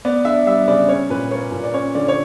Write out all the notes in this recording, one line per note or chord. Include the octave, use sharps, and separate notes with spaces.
B3 D5
D4 E5
G3 E5
C#3 D5
C#4 C#5
A#2 B4
A#3 C#5
A#2
D5
C#4 C#5
D3 D5
C#5